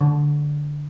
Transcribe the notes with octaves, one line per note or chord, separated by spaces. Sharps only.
D3